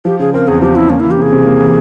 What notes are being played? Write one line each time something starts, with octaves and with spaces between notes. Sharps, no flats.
F3 G4
C#3 G#4
C4 A#4
E2 G#4
F3 G4
C#3 E4
A#3 C#4
E3 E4
G4
C3 G#4
C3
A#3
E3